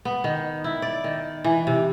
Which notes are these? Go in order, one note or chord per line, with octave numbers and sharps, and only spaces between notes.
B3
D#3
E4
D5
D#3
E3
C3